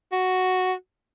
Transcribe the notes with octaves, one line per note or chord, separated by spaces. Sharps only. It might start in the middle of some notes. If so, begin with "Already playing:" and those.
F#4